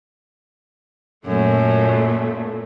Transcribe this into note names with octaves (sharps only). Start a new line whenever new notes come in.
F#2 A#2 A3